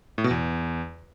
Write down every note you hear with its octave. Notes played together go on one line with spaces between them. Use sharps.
A2
B2
E2